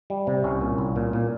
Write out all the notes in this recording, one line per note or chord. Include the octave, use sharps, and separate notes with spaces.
G3
C3
C2 C#4
A#2
C2
A#2
A#2